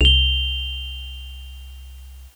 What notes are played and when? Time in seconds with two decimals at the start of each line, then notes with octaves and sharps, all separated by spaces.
0.01 C2 F7 G7